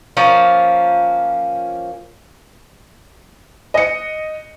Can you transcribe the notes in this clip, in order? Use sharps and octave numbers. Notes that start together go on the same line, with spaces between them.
F3 A#3 C#4
D#5 C#7